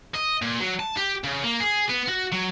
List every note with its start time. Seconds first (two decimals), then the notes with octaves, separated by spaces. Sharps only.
0.15 D#5
0.42 A#2
0.60 F#3
0.80 A5
0.97 G4
1.24 C#3
1.44 A#3
1.60 G#4
1.89 B3
2.09 F#4
2.33 F#3